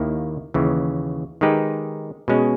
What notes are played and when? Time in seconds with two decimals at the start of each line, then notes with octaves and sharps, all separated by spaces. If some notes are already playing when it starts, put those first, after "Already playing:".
Already playing: D#2 D#3 A#3 E4 G4
0.54 D#2 C#3 E3
1.41 D#3 G#3 D#4 G4 B4
2.28 B2 G#3 C#4